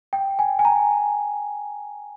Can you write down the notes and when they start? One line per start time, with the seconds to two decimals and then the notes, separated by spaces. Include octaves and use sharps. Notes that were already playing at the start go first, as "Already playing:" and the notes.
0.13 G5
0.39 G#5
0.59 G#5
0.65 A#5